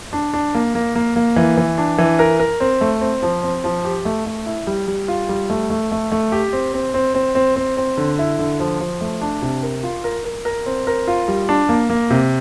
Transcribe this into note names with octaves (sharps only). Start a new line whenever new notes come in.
D4
D4
A#3
A#3
A#3
A#3
E3
E3
D4
E3
A#4
A#4
C4
A3
C4
F3
C4
F3
G4
A3
A3
E4
G3
G3
F4
G3
A3
A3
A3
A3
G4
C4
C4
C4
C4
C4
C4
C4
D3
E4
D3
F3
F3
A3
D4
C3
A#4
F4
A#4
A#4
A#4
C4
A#4
F4
G3
D4
A#3
A#3
C3